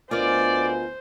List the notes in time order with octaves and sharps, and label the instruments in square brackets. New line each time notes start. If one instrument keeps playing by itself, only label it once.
[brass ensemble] D2 B3 G#5 [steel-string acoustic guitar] F4 A#4 D#5 [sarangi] C5 [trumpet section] D5